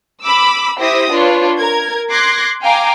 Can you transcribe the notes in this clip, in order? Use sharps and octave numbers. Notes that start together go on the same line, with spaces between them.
B5 D6 E6
E4 G4 C5 E5 D#6 A#6
D4 F4 B4 C#5
A#4 G#6
C6 D6 F#6 G#6 A#6 C7
F5 G5 G#5 A#5 D6